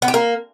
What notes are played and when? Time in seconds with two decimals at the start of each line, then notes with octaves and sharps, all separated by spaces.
0.02 B3
0.08 G4
0.14 A#3